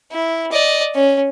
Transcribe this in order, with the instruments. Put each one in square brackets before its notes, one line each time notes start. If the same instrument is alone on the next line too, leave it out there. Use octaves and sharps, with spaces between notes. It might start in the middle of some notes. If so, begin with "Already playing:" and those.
[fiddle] E4
D5 D#5
C#4